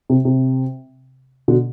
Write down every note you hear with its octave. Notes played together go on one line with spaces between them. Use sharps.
C3
C3
B2 D3